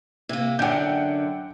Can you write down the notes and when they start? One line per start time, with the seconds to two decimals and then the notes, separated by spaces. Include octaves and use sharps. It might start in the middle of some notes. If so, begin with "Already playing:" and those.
0.29 C3 A#3
0.59 F#2 D3 F#5 G5 G6